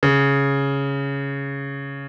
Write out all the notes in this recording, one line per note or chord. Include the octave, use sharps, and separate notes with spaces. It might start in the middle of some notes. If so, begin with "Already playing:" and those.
C#3